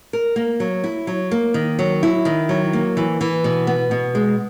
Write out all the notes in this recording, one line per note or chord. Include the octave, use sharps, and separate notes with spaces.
A#4
A#3
F#3
E4
F#3
A#3
D#3
F#3
E4
D#3
F#3
A#3
E3
E3
B2
B3
B2
G#3